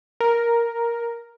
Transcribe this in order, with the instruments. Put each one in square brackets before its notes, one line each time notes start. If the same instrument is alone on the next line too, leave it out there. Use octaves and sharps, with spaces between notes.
[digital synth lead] A#4